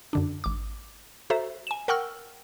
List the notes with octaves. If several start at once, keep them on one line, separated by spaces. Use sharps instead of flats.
F#2 D3 D4
G#1 D6
F#4 A4 C5 E5 A#5
G#5 E7
A#4 F#5 G5 C#6 E6 F6